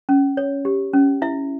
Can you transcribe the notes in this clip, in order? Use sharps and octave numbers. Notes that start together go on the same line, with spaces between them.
C#4
C#5
G4
C#4
E4 E5